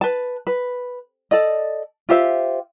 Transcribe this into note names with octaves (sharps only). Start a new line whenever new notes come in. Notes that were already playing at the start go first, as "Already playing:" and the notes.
B4 A5
B4
A4 D5 D#5
F4 G4 C5 E5